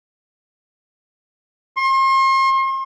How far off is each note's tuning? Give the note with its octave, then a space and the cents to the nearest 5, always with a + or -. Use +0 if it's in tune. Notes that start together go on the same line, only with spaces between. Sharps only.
C6 +40